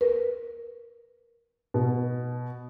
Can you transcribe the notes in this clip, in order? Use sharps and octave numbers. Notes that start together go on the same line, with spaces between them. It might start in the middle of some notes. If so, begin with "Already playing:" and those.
A#4 B4
B2